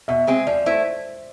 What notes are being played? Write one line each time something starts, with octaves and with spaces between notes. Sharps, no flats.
B2 E5
G#3 C4 G#4
F3 D5
A3 E4 C5